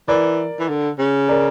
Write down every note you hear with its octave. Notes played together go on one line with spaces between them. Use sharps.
E3 A#4 D5
E3
D3
C#3
A#4 D5